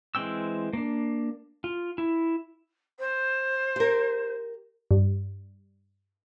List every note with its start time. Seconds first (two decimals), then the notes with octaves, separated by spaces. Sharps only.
0.15 E3 G#3 C4 G5 E6
0.73 A#3 D4
1.64 F4
1.98 E4
2.99 C5
3.76 G4 A#4
4.91 G2